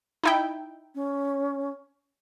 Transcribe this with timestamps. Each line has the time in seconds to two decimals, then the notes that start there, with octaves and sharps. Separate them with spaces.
0.23 D#4 E4 G5
0.95 C#4